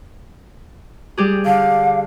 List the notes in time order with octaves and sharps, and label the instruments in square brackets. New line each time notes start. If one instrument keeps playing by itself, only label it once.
[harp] G3 G4 G#4
[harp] D3 [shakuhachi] F5